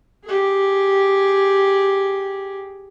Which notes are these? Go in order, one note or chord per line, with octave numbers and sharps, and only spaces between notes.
G4 G#4